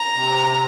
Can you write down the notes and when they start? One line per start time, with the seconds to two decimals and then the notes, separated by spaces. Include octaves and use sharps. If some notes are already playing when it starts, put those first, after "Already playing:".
Already playing: A#5
0.15 C3